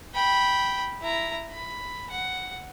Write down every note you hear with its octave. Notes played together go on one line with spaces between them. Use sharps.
G5 B5
E4 A#5
B5
F#5